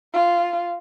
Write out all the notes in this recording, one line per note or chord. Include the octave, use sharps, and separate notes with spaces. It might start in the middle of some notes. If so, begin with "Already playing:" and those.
F4